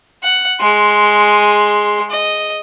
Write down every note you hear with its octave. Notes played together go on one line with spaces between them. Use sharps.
F#5
G#3 C6
D#5